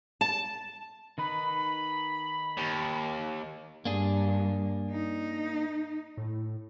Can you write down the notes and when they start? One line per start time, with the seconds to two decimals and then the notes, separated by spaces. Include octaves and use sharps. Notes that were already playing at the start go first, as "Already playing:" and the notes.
0.21 A5
1.18 D#3 D#4 B4 B5
2.58 D#2
3.85 G2 A#3 D4 G#4
4.91 D#4
6.17 A2